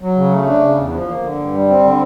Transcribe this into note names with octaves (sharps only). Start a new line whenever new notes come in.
F#3
C#3
A3
D4
C#3
E2
F3
A#3
D3
G2
G3
C4
D3